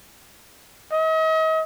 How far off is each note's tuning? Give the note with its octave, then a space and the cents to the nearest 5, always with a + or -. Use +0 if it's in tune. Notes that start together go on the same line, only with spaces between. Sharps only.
D#5 +40